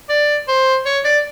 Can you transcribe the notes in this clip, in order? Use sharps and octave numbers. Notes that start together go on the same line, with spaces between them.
D5
C5
C#5
D5